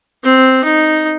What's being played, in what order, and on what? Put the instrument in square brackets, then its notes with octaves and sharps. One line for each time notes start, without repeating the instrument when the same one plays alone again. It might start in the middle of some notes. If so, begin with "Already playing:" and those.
[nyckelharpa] C4
D#4